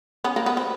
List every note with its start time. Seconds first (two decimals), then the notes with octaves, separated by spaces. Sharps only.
0.24 B3 C#4
0.36 A#3
0.46 B3
0.57 C4